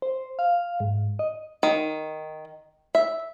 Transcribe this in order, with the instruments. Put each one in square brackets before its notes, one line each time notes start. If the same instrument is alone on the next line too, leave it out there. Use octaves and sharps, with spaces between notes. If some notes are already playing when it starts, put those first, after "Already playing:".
[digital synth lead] C5
F5
G#2
D#5
[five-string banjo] D#3
E5